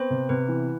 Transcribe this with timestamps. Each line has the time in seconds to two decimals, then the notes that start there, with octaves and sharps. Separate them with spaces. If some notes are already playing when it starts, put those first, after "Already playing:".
Already playing: B3 C4 C5
0.10 C3
0.29 C3 B3 B4
0.48 E3